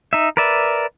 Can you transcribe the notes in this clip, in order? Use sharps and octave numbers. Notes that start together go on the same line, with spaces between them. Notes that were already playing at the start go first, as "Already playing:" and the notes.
D#4 E5
A#4 B4 D5 E5